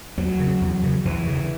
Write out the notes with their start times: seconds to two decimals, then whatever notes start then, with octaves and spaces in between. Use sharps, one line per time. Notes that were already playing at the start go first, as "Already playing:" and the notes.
0.17 E2 F#3
0.40 C#3
0.61 E2
0.84 C#3
1.05 E2 E3
1.27 C#3